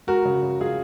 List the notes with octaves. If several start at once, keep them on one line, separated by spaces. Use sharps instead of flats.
G#3 F#4 A#4
C#3
C#3
C#3 F4 G#4